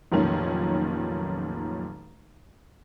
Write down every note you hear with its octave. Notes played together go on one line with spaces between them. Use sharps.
F1 B1 A#2 D#3 C#4